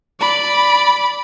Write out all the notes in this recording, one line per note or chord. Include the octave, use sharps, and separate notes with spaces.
D5 B5